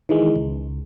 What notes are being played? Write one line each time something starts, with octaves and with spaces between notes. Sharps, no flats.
D#3 E3 G#3
C#2